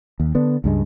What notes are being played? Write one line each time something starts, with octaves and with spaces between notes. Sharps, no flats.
D#2
D3 B3 D4
C#2 G2 G#3